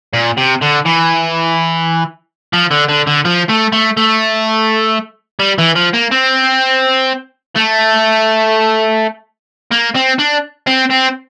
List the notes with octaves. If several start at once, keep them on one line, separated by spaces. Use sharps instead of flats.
A#2
C3
D3
E3
F3
D3
D3
D3
F3
A3
A3
A3
G3
E3
F3
A#3
C4
A3
A#3
C4
D4
C4
C4